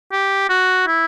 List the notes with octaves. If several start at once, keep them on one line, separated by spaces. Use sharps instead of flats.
G4
F#4
E4